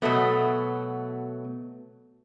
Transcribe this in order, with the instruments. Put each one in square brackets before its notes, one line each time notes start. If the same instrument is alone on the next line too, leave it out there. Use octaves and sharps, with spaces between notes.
[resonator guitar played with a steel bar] B2 F#3 A3 B3